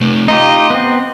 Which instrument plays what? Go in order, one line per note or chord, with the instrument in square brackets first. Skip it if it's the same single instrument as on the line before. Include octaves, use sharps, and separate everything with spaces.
[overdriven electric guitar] C3 A3
[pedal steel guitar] D#4 F4 G4 [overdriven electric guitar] D#5
[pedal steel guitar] B3 C4